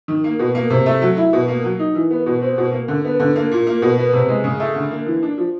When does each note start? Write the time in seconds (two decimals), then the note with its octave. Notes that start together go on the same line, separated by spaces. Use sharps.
0.08 D#3
0.24 A#3
0.39 B2
0.55 A#3
0.70 C3
0.86 A3
1.02 F#3
1.17 E4
1.33 B2
1.48 A#3
1.64 F#3
1.79 D#4
1.95 E3
2.11 B3
2.26 B2
2.42 C4
2.58 B2
2.72 A#3
2.88 D3
3.05 B3
3.20 D3
3.36 A#3
3.52 A#2
3.67 A#3
3.82 B2
3.98 B3
4.13 C3
4.29 G#3
4.44 C#3
4.60 A3
4.76 D3
4.91 A#3
5.06 E3
5.23 D4
5.38 F3